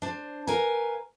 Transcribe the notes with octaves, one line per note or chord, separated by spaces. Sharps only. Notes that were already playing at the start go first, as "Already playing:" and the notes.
D4 C5
A#4 B4 F5 G#5